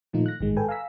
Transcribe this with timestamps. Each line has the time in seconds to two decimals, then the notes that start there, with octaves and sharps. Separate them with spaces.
0.13 A#2 D#3 F3 A3 D#4 F4
0.26 F#6 A#6
0.41 A1 G#2 D#3 G#3
0.57 A4 B4 G5 G#5
0.69 F5 G#5 A#5 E6 B6